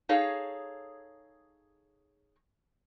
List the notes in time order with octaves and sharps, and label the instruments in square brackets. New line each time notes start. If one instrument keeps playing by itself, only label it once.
[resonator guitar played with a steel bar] D#4 G#4 A4 C#5 F5